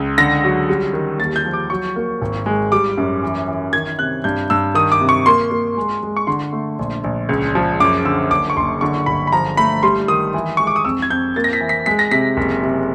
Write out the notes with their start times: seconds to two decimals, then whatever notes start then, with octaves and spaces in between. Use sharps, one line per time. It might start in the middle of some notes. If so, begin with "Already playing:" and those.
Already playing: C#2
0.18 D3 A#6
0.44 F#3
0.69 G3
0.93 D#3
1.19 D#2 A6
1.36 G6
1.45 F3
1.53 D6
1.70 F#3 C#6
1.96 A#3
2.22 G#1
2.46 G#3
2.72 G3 D6
2.98 F#2
3.23 E3
3.48 E3
3.73 D#3 G#6
3.99 C3 F#6
4.24 G2 G6
4.50 G2 E6
4.75 D#3 D#6
4.92 D6
5.01 C3
5.09 C#6
5.26 A#3 C6
5.51 A#3
5.77 G#3
6.03 G#3
6.17 C#6
6.27 D3 C6
6.53 A3
6.79 A#1
7.04 A#1
7.29 C#2
7.55 F3
7.80 F#2 D6
8.05 D3 E6
8.31 F#1 D6
8.50 C#6
8.57 F#1 C6
8.81 D3 C#6
9.06 G1 B5
9.27 B5
9.32 F3 A#5
9.57 A3 B5
9.83 G3 C6
10.08 D#3 D#6
10.34 E3
10.57 G#3 C#6
10.67 D6
10.76 D#6
10.85 F2 E6
11.02 G#6
11.10 F2 G6
11.36 A#3 A6
11.44 A#6
11.53 B6
11.61 E3
11.69 B6
11.86 G#3 B6
11.99 A#6
12.11 C3 B6
12.37 F#1
12.63 C3